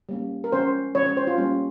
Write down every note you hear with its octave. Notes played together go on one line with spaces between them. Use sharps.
G3 A#3 C#4
A#4
F3 G#3 C#4 C5
F3 G#3 C#4 C#5
C#5
C5
F4
G3 A#3 C#4